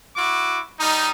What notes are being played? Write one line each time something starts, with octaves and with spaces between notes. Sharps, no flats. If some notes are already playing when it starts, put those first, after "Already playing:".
E4 F#4 D6
G3 D#4